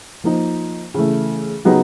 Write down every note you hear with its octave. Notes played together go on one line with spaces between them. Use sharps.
F3 A#3 D#4
C#3 E3 A3
C#3 F#3 B3 D#4 G4